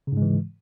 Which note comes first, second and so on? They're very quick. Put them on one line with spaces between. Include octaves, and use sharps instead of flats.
C#3 G#2 G#3 E3